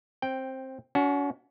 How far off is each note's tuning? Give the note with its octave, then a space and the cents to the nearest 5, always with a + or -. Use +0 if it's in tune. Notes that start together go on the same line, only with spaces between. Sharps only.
C4 +15 G5 +0
C#4 +40 F#4 +0